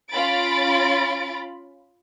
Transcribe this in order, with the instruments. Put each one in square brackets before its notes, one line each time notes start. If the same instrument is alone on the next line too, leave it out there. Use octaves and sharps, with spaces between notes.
[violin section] C#4 F4 B5 A6 D7